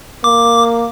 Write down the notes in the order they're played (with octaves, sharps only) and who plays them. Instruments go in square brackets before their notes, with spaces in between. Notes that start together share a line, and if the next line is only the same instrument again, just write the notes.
[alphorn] A#3 [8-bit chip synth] D6